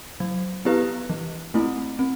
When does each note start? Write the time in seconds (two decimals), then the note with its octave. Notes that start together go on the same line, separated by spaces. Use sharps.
0.20 F#3
0.65 B3 E4 G4 B4
1.10 E3
1.54 A3 C4 E4
1.99 C4